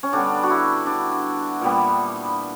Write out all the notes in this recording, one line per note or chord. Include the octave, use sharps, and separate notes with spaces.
C#4
D3 G3 B3 D4
F#4
E4
D4
A#2 G3 B3